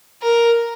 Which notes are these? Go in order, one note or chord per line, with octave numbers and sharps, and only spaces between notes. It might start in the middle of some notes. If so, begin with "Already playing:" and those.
A#4